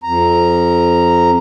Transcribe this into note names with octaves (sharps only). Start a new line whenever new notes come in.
F2 A#5